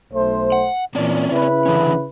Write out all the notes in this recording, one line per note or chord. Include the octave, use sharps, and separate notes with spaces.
B1 A3 C5
F#5
A#2 E3 C4 C#4 D5
C#3 E4 B4
D3 E3 C#4